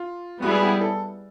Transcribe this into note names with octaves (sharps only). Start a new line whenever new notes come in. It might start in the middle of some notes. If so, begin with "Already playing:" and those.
Already playing: F4
G3 B3 E4 F#4 G#4
G4
A4